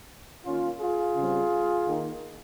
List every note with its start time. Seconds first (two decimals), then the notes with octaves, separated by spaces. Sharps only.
0.45 D#3 A#3 C#4 F4
0.80 F4 G#4
1.15 C#3 G3 C4
1.86 D#3 A#3